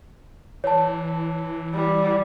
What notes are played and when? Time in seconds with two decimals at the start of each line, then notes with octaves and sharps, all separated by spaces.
0.64 E3 C#5 A5
1.74 G3